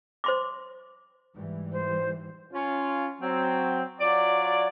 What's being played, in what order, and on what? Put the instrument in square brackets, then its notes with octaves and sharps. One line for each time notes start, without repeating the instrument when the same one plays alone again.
[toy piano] C5 C6 D6
[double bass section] G#2 E3 G3
[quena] C5
[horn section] C#4 F4
F#3 C4
F#3 F4 D5